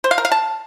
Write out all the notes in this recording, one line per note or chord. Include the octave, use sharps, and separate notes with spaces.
C5
F5
A#4
F5
A5